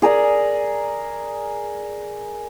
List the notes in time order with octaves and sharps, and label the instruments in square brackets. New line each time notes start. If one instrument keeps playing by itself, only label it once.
[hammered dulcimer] G#4 A#4 D5 G#5